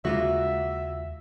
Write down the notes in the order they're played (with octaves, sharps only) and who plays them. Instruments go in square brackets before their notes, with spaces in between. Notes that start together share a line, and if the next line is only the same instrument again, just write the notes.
[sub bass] D#2 [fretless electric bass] C#3 G#3 [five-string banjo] A#3 F4 F#4 [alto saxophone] E5